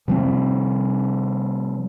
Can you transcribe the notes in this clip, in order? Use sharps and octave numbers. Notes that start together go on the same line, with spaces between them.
C3 F3 G3 C4